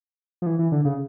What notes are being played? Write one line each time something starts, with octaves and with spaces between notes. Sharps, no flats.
F3
E3
E3
D3
C#3